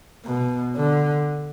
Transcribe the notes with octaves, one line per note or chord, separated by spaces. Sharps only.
B2
D3